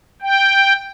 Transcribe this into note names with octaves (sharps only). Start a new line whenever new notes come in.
G5